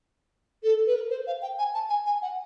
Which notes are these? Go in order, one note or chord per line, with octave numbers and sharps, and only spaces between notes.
A4
B4
A#4
C5
F5
G5
G#5
A5
G#5
G#5
F#5